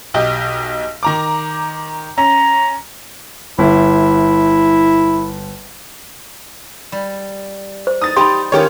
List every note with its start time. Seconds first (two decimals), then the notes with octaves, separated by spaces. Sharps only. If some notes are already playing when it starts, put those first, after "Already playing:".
0.14 B1 G4 D#5
1.03 D#3 A#5 D6
2.18 C#4 A#5
3.59 G1 E4
6.92 G3
7.87 C5
8.01 D#4 D#6 A6
8.16 D#4 G4 G5 B5 C6
8.52 D#3 C#4 F4 G4 C#5